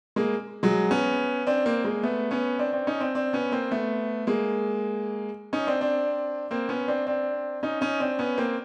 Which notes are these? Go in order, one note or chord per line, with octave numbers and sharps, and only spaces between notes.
G#3 A#3
F#3 G#3
B3 C#4
C4 D4
A#3 C4
G#3 A#3
A3 B3
B3 C#4
C4 D4
C4 D4
C#4 D#4
C4 D4
C4 D4
B3 C#4
A#3 C4
A3 B3
G#3 A#3
C#4 D#4
C4 D4
C4 D4
A#3 C4
B3 C#4
C4 D4
C4 D4
C#4 D#4
C#4 D#4
C4 D4
B3 C#4
A#3 C4